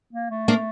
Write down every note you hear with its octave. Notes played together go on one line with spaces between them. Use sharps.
A#3
A3
A#3 D4